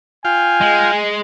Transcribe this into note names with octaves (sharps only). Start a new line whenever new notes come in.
F4 F5 G5 G#5
G#3